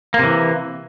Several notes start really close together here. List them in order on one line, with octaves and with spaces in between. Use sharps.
A#3 C3 E3